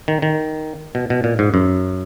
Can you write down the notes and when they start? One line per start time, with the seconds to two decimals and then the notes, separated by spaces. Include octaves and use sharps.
0.08 D#3
0.22 D#3
0.95 B2
1.10 B2
1.24 A#2
1.39 G#2
1.54 F#2